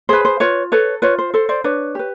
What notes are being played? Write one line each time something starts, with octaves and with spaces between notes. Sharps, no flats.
G#4 B4 C5
C5
F4 B4 C#5
A4 B4 C#5
F4 B4 C#5
C5
A4 C5
C5 D5
D4 B4 C#5
G4 B4